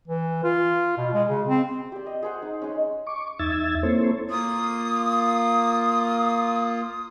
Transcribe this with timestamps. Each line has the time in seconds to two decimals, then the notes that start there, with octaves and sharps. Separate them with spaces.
0.08 E3
0.44 F4
0.98 B2
1.14 G#3
1.29 C#3
1.47 C4
1.92 G4 D5
2.06 D#5
2.22 G#4 C5 F#5
2.42 D#4
2.62 G#3 C#4
3.07 C#6 D6
3.39 E2 D#4 E5 E6 G#6 A6
3.83 A#3 C4 E4 A4 C5 C#5
4.30 A#3 F4 D#6